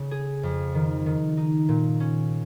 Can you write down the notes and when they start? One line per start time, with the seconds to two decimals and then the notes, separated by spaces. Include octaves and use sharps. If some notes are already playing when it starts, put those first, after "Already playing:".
Already playing: C#3
0.11 G#4
0.43 F2
0.75 D#3
1.06 D#3
1.37 D#4
1.69 A#2
2.00 C#4